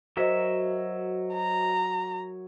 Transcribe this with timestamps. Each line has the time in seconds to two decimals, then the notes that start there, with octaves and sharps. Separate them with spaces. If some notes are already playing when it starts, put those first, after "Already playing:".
0.17 F#3 F#4 A#4 C5 D#5 E5
1.33 A#5